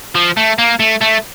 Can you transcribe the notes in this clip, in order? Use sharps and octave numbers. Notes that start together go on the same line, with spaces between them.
F3
A3
A#3
A3
A3